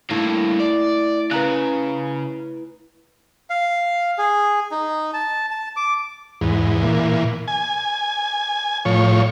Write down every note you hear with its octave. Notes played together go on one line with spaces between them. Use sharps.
G2 A3 A#3 E4
D5
C#3 B4 A#5 F#6
F5
G#4
D#4
A5
A5
D6
E2 G#2
A#2 E3
G#5
A2 F3 C#5